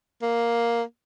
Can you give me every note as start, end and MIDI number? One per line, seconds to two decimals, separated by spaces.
0.22 0.83 58